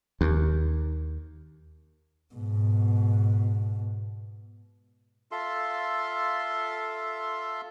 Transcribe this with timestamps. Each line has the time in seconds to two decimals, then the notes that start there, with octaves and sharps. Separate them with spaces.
0.21 D#2
2.35 G#2 B2
5.31 F4 A4 E5 C6